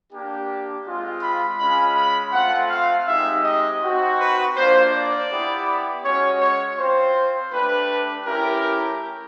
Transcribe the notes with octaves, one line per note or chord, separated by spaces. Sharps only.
A#3 D4 G4
G#3 C4 F4
B5
G#3 C#4 F4 B5
B5
A3 C4 F4 F#5
F5
G#3 C4 D#4 G4 E5
D#5
C4 D#4 F#4
B4
A#3 D4 F4 C5
D5
B3 E4 G4
G#3 C#4 F#4 C#5
C#5
C4 F4 C5
A3 D4 G4 B4
A3 C#4 E4 G4 A#4